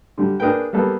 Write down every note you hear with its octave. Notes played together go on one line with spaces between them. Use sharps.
D3 G3
A#3 D4 G#4 A#4 B4 G5
G3 A#3 B3 A4